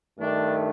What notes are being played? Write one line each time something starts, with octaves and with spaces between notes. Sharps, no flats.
G2 D#3 A3 D4